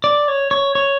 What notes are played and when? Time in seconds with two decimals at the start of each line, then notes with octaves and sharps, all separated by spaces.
0.04 D5
0.28 C#5
0.51 C#5
0.75 C#5